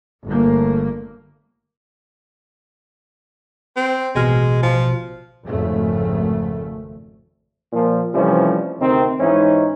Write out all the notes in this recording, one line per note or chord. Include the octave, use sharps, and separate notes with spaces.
G1 A3 A#3
C4
A1 B2 G#3 F6
F3
G#1 F2 C#3 A3
A#2 F3
C3 E3 F3 G3 A3 C#4
D2 C3 D#3 C4 D#4 C5
G#2 E3 C#4 D#4